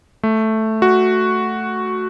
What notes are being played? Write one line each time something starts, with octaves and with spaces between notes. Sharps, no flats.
A3
F#4